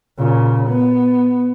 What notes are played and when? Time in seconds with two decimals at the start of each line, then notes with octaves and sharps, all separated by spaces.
0.17 A#2 C#3
0.69 B3